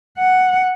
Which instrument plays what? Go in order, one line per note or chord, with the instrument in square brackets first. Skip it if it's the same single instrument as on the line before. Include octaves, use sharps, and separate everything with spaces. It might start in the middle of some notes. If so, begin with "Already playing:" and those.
[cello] F#5